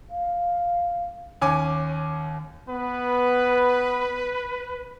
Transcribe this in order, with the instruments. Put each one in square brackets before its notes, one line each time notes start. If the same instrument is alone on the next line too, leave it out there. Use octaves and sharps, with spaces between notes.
[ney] F5
[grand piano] D#2 C#4 G#5 D6
[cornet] B3 [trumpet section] B4